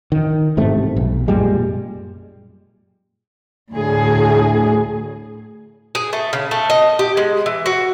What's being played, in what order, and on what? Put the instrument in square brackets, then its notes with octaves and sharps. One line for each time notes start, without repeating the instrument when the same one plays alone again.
[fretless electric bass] D#3
A1 G#2 C3 A3
B1
F#2 A#2 G3 G#3
[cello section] D2 A2 G#4
[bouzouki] G#4
A3
C#3
A3
D#5
G4
G#3
E3
F#4